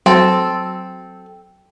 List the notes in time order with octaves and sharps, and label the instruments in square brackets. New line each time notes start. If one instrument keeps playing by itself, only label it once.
[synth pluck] F#3 [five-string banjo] C4 A4